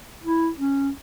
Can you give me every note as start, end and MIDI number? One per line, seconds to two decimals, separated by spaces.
0.24 0.49 64
0.58 0.90 61